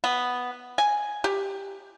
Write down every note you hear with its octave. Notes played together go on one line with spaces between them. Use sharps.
B3
G#5
G4